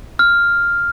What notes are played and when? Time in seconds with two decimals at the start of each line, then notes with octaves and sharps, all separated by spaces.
0.19 F6